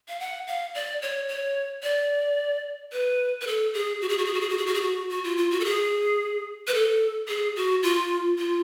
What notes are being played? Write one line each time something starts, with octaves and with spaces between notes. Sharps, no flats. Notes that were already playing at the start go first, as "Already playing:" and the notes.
F5
F#5
F5
D5
C#5
C#5
D5
B4
B4
A4
G#4
F#4
G#4
F#4
G#4
F#4
G#4
F#4
G#4
F#4
G#4
F#4
F#4
F4
F4
F#4
A4
G#4
B4
A4
G#4
F#4
F4
F4